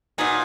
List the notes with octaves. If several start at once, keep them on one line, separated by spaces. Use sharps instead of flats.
A#2 F#3 B3 D#4 G#4